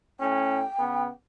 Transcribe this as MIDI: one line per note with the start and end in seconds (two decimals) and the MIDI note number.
0.20 0.63 45
0.20 0.63 61
0.20 1.08 79
0.79 1.08 49
0.79 1.08 59